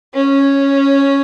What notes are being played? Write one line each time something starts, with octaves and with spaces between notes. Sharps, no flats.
C#4